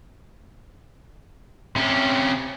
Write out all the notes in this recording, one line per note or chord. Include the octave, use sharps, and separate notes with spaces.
C3 C#4